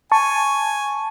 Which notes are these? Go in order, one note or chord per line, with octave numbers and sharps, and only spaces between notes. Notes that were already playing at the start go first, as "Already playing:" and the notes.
G#5 A5 C#6